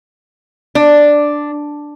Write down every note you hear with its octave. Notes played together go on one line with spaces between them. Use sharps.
D4